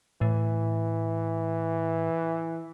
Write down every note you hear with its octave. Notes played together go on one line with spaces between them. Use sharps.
A2 E3